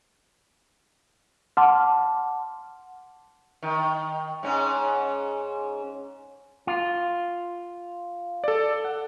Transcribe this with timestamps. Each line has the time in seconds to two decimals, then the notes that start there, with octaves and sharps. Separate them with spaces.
1.57 F#5 A5 C6 D6 F6
3.62 D#3
4.43 G#2 C#4
6.67 F4
8.44 A4 D5
8.85 F#5